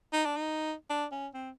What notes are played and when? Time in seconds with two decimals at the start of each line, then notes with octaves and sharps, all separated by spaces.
0.13 D#4
0.25 D4
0.37 D#4
0.90 D4
1.12 C#4
1.34 C4